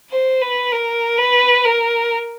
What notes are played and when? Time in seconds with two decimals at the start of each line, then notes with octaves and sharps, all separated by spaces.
0.10 C5
0.41 B4
0.72 A#4
1.18 B4
1.65 A#4